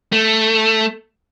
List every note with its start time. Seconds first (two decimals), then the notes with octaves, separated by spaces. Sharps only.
0.12 A3